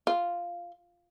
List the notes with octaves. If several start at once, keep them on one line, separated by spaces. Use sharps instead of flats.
F4